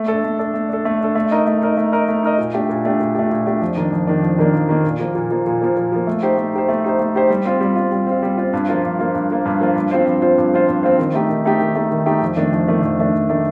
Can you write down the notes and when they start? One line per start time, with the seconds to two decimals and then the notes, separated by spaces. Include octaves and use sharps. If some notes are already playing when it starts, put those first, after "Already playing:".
Already playing: A3
0.08 D4 A4
0.24 A3
0.39 D4 A4
0.54 A3
0.69 D4 A4
0.85 A3
1.00 D4 A4
1.15 A3
1.31 D#4 A#4 D#5
1.47 A3
1.62 D#4 A#4 D#5
1.77 A3
1.92 D#4 A#4 D#5
2.08 A3
2.23 D#4 A#4 D#5
2.38 A#2
2.54 A3 D4 G4
2.69 A#2
2.85 A3 D4 G4
3.00 A#2
3.15 A3 D4 G4
3.31 A#2
3.47 A3 D4 G4
3.61 F2
3.77 D#3 A#3 D4
3.92 F2
4.07 D#3 A#3 D4
4.23 F2
4.39 D#3 A#3 D4
4.54 F2
4.69 D#3 A#3 D4
4.84 A#2
4.99 F3 A#3
5.15 A#2
5.31 F3 A#3
5.46 A#2
5.62 F3 A#3
5.76 A#2
5.92 F3 A#3
6.07 A3
6.23 D#4 G4 C5
6.37 A3
6.53 D#4 G4 C5
6.69 A3
6.84 D#4 G4 C5
6.99 A3
7.15 D#4 G4 C5
7.30 G3
7.45 C4 F4
7.61 G3
7.76 C4 F4
7.92 G3
8.07 C4 F4
8.23 G3
8.37 C4 F4
8.53 G2
8.69 F3 A#3 F4
8.84 G2
8.99 F3 A#3 F4
9.14 G2
9.30 F3 A#3 F4
9.45 G2
9.60 F3 A#3 F4
9.76 G2
9.91 F3 C4 F4 C5
10.07 G2
10.22 F3 C4 F4 C5
10.38 G2
10.52 F3 C4 F4 C5
10.68 G2
10.83 F3 C4 F4 C5
10.99 D#3
11.14 A3 D#4 G4
11.29 D#3
11.45 A3 D#4 G4
11.61 D#3
11.76 A3 D#4 G4
11.91 D#3
12.06 A3 D#4 G4
12.22 F2
12.37 D#3 A3 D4
12.53 F2
12.68 D#3 A3 D4
12.83 F2
12.99 D#3 A3 D4
13.14 F2
13.29 D#3 A3 D4